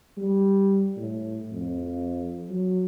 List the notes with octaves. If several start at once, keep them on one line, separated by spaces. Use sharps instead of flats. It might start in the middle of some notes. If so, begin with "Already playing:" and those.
G3
A2
F2
F#3